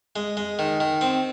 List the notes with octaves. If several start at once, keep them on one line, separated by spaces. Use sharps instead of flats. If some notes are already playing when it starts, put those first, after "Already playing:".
G#3
G#3
D#3
D#3
C4